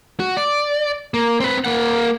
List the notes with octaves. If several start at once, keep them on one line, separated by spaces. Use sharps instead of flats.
F#4
D5
A#3
C4 B4
A#3 F#5